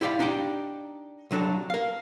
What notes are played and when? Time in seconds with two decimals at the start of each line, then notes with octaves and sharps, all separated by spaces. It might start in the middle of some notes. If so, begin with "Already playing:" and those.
0.01 E4 G4 D5 F5 B5
0.19 D4 D#4 G4 D5 G5
1.31 C2 F#3 D4 A4
1.70 A#4 F5